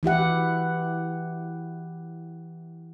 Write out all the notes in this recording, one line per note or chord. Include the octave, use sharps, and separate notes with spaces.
E3 E4 G4 F#5